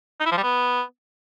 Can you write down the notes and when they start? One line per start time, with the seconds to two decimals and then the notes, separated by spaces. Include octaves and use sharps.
0.20 D#4
0.26 E4
0.32 F3
0.37 G3
0.43 B3